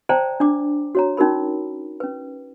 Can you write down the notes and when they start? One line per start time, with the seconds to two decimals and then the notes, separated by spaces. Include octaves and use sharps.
0.09 C5 D5 G5 A5 A#5
0.40 D4 D5 D6
0.95 F#4 C#5 A#5
1.17 C#4 D#4 F#4 A#4 B5
2.00 C#4 B4